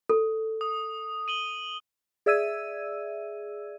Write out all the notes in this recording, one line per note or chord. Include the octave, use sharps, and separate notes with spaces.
A4
D#6
D#7 F#7 G7
G#4 D5 E5 E6 G#6 D#7